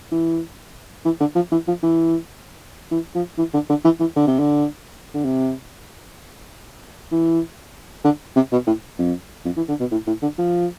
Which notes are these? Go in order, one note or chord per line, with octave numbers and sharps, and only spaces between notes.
E3
E3
D3
F3
E3
F3
E3
E3
F3
E3
D3
D3
E3
E3
D3
C3
D3
D3
C3
E3
D3
C3
B2
A2
F2
F2
E3
D3
B2
A2
A2
D3
F3